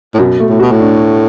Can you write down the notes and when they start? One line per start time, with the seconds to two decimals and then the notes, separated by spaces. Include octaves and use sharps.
0.14 A2
0.19 F#2 B2
0.40 A3
0.49 A2
0.59 B2 F#4
0.72 A2
0.79 D4